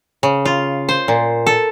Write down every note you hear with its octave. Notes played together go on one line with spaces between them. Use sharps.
C#3
F4
C5
A#2
A4